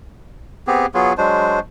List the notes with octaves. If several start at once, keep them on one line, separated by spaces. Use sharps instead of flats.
B3 C4 G4 G#4
F#3 B3 F4 G#4
F#3 G#3 D4 C5